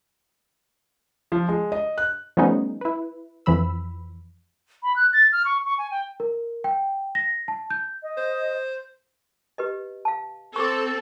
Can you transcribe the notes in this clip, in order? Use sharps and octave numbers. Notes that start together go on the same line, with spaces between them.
F3
G#3
D#5
F#6
F3 G3 A3 B3 C#4 D#4
E4 B4
F2 E3 F3 B5 E6
B5
F#6
A6
F6
C#6
C#6
G#5
G5
A#4
G5
A#6
A5
G6
D#5
C5
G4 B4 D#5
F5 A5
C4 A4 C#6 D6